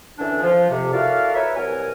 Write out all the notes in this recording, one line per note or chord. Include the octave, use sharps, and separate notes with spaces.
F#2 D3 E3 C#4 D4
F3
F2 C3
E4 F#4 A4 A#4 D5 F5
A#4 B4 C#5 E5
C2 B2 F#3 A#4 G#5